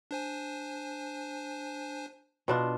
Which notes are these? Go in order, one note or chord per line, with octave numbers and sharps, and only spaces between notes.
D4 C5 G#5
B2 D4 F4